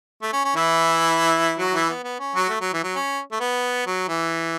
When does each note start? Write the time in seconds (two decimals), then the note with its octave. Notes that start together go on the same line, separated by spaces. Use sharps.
0.22 A3
0.33 C#4
0.45 C#4
0.56 E3 E4
1.58 F#3 F#4
1.73 E3 E4
1.89 B3
2.04 B3
2.19 C#4
2.35 F#3 F#4
2.49 A3
2.61 F#3
2.73 E3
2.83 F#3
2.95 C#4
3.32 A3
3.40 B3
3.87 F#3
4.09 E3